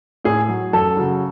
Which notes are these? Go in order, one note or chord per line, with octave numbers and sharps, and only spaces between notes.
A2 G#4
F#3
F#2 A4
C#3 F#3